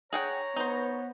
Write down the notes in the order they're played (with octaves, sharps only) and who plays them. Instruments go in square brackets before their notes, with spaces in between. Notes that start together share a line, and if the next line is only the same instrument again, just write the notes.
[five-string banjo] G#4 F#5 G5 [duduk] C#5 [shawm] A#5
[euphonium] B3 [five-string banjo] D#4 C5